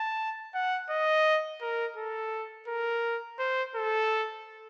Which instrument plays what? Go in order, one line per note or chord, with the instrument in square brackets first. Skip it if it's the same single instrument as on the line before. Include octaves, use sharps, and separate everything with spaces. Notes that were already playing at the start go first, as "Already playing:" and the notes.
Already playing: [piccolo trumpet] A5
F#5
D#5
A#4
A4
A#4
C5
A4